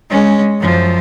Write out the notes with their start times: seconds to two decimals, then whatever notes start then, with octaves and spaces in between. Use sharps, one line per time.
0.10 G#3 C#4
0.60 F#2 F3